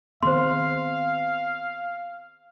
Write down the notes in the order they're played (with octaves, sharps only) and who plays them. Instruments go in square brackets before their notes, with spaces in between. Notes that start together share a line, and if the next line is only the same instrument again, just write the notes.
[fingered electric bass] D#3 B3 C4 [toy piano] G#4 C5 [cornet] F5 [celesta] C6